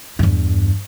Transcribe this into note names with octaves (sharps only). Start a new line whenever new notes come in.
E2 G2